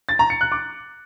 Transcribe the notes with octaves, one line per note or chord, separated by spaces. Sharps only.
A6
A#5
C#7
F#6
D6